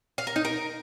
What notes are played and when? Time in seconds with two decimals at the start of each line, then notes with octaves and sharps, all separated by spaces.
0.18 F5
0.27 A#4
0.36 D#4
0.45 A#4